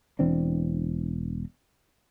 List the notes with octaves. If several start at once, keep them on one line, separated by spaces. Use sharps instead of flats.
E1 E3 C4 D4